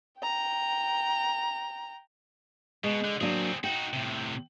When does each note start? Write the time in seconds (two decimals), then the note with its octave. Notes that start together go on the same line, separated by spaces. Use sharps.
0.20 G5 A#5
2.84 B2 G#3
3.04 D3
3.21 F#3 A#3 C4 D4 G#4
3.64 D#4 F#4 G5
3.93 A2 C3